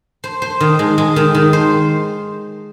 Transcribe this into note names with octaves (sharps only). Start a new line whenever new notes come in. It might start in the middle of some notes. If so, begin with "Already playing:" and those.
C5
C5
D#3
G#3
G#3
D#3
D#3
C5